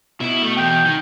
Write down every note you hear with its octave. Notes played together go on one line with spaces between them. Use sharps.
B2 E4
A3
E2 G5
D#3